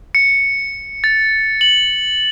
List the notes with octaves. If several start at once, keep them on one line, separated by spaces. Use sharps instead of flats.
C#7
A6
F#7